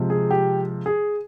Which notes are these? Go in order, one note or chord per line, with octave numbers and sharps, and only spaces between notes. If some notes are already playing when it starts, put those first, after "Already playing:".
Already playing: C3 F3 G#3
G#4
G4
G#4